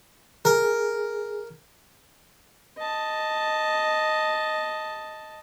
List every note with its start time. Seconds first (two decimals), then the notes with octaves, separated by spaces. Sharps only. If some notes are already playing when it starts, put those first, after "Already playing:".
0.45 G#4 A#4
2.78 D#5 A5